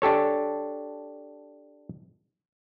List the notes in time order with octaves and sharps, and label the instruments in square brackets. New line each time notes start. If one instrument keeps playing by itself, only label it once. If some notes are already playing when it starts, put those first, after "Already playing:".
[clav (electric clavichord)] D4 G4 A4 C#5